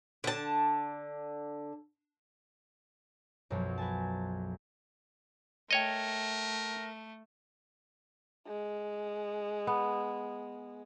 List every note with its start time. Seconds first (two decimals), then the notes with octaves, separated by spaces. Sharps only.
0.24 D3 A5
3.50 B1 F#2 B2 F3 F#3
3.78 B4 G#5 A5
5.71 A3 A#4 C#5 D#5 G5 A#6 C#7
8.47 G#3
9.67 B3